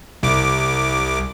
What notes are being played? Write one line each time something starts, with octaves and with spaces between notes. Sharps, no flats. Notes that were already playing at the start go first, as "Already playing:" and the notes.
C2 D6